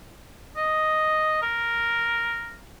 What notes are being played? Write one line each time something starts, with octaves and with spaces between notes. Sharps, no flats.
D#5
A#4